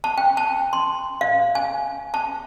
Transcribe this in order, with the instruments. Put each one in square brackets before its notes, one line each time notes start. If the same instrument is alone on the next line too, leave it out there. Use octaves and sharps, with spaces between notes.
[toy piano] A5
G5
A5
C6
F5
G#5
A5